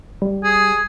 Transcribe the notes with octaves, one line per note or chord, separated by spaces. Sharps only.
G3
G#4